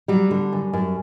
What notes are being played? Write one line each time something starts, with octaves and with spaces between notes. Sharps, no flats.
F#3 G3
D3
F#2
F#2